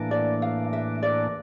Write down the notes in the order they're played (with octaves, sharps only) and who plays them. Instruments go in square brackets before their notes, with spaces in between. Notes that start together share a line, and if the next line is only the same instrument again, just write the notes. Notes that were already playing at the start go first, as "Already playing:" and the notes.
Already playing: [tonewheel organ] A2 E3 A#3 D4
[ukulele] D5
F5
E5
D5